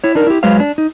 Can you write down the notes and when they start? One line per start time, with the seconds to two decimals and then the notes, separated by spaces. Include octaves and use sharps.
0.04 E4 C#5
0.15 D4 D#4 A#4
0.27 E4 G4
0.43 F#3 G#3 B4 C5 F5
0.60 D4
0.78 D#4